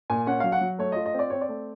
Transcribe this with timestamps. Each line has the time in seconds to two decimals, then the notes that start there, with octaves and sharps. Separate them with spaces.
0.10 A#2 G#5
0.27 C#4 F#5
0.40 F#3 F5
0.52 F#5
0.61 F#3
0.79 A3 C#5
0.92 F4 D#5
1.06 D#5
1.14 C4
1.19 D5
1.30 C4 C#5
1.41 D5
1.49 A3